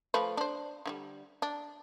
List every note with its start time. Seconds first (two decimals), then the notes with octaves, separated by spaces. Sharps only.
0.14 F3 A3 B4
0.37 D4 C5
0.86 D3 F3 G3
1.42 D4